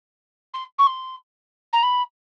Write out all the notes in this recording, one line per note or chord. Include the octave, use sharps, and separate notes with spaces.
C6
C#6
C6
A#5
B5